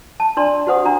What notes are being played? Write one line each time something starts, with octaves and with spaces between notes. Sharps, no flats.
A5
D4 D5 C6
F#4 G4 C5 F#5 D#6
D4 A#5